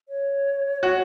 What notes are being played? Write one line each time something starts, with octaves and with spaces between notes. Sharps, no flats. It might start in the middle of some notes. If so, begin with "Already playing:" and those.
C#5
F#4